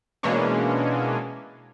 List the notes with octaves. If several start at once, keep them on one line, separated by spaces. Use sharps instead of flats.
B2 E3 G#3 A#3 C#4 D4